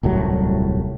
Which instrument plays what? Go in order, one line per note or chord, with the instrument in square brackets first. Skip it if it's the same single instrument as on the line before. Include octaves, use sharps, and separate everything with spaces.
[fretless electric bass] D#1 C2 A2 F#3